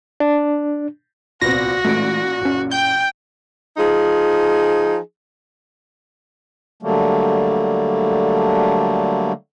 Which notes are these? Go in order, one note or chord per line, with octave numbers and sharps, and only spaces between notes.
D4
D1 C2 A#2 B3 C4 F#4 A#6
A1 A#2 E3 G#3 A3 D7
F#1 C#4
G5 G6
F3 D#4 G#4
D3 F#3 G3 A3 A#3